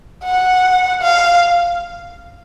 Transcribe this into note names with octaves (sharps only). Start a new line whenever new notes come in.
F#5
F5